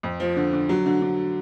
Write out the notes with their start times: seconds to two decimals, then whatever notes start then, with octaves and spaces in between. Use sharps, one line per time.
0.03 F2
0.20 F3
0.37 D3
0.53 D3
0.69 F#3
0.86 D3
1.02 D3